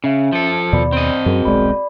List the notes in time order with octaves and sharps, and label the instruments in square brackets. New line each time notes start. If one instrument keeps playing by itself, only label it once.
[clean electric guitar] C#3 [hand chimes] C#4 E5
[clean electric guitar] F3 A4
[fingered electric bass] D#2 B2 [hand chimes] D5 F5 B5
[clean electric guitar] C4 D#5
[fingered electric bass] F#2 [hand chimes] F#4 G#4 A#4
[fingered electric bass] D#1 B1 G#3 [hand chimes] D5 B5